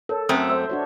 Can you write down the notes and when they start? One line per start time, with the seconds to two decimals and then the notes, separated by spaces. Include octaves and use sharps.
0.09 A4 A#4 C#5
0.29 F#2 A3 C4 C5 D#6
0.49 C5 E5 E6
0.69 D4 F#4 C#5